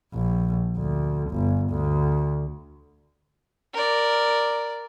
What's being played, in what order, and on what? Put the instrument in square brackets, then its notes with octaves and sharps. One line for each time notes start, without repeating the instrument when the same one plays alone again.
[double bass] A#1
D2
G1
D2
[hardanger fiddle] A#4 D5